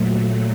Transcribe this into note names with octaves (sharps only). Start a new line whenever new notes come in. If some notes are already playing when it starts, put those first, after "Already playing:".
Already playing: A#2 F#3 A3